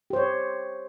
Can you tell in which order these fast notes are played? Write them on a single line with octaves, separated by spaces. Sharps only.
G4 C5 C#5